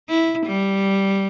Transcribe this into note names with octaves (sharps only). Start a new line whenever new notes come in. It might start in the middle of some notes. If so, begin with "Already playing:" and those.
E4
G3